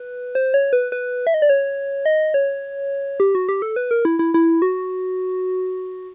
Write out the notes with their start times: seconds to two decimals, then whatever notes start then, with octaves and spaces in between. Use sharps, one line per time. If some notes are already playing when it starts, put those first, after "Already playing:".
Already playing: B4
0.35 C5
0.54 C#5
0.73 B4
0.92 B4
1.27 E5
1.34 D#5
1.42 D5
1.49 C#5
2.06 D#5
2.34 C#5
3.20 G4
3.35 F#4
3.49 G4
3.62 A4
3.76 B4
3.91 A#4
4.05 E4
4.19 E4
4.34 E4
4.62 F#4